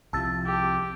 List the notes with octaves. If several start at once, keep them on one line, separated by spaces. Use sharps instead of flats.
C2 C3 F3 A5 E6 A6
G4